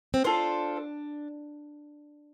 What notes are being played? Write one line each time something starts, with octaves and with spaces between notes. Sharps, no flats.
C4
D4 F4 A4 C5